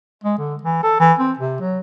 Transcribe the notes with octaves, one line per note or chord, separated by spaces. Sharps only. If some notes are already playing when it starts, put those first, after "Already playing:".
G#3
D3
E3
A4
E3
C4
C3
F#3